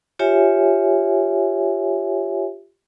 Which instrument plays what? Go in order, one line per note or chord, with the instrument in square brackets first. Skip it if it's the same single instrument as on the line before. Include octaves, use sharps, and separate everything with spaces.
[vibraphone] F4 G4 C#5 E5 G#5